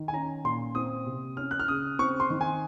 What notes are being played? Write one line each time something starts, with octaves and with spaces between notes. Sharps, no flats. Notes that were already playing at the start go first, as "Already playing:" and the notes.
Already playing: D#3
G#5
C#4 A#5
A#2 C6
C4 D#6
C3
C#4 F6
F#6
F6
C#3 D#6
C4 C#6
C6
D#3
G#5